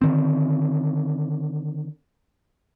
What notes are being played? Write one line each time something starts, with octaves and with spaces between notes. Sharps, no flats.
D3 D#3 C4